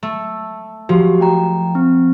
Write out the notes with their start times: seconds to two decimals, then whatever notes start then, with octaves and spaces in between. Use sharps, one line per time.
0.03 A3
0.89 F3 F#4 G4
1.20 A3 G5 A#5
1.75 C4